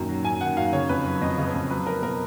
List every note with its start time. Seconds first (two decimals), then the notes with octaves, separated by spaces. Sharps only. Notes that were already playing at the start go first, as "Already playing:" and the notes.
Already playing: F#2 A#2 D#3
0.09 F#3
0.24 F#2 G#5
0.41 D#3 F#5
0.57 F#2 F5
0.73 C#3 C#5
0.89 F2 B4
1.06 F#3
1.21 F2 D#5
1.38 C#3
1.46 B4
1.54 F2
1.70 F#3 B4
1.87 F#3 A#4
2.02 B2 A#4